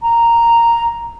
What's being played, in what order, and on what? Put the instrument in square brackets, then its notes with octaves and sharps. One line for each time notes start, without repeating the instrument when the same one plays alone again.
[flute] A#5